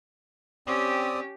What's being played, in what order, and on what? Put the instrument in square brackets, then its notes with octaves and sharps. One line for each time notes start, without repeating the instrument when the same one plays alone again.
[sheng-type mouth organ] C4 D5 D#6 [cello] C#4 G4